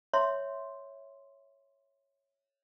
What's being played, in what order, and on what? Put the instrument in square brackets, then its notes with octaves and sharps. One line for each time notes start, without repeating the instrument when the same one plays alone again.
[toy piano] C#5 E5 C6